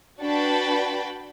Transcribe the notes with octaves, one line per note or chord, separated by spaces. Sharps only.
D4 F#4 B4 G5 A5 B5